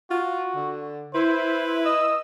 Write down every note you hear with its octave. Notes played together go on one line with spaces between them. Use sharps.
F4 F#4
D3
E4 B4 C5
D#5 E6